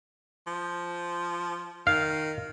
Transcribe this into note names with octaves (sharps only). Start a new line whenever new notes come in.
F3
D#3 F5